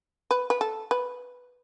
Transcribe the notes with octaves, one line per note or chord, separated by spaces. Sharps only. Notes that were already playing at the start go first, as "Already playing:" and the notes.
B4
B4
A4
B4